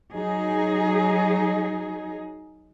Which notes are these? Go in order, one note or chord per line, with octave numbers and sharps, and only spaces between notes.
F#3 D#4 G#4